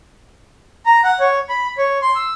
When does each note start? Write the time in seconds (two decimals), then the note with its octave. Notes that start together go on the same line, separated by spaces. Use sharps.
0.86 A#5
1.04 F#5
1.20 C#5
1.49 B5
1.78 C#5
2.02 C6
2.16 E6